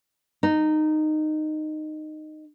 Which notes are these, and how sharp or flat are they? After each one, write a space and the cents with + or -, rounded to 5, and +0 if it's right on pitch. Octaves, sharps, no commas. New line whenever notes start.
D#4 -15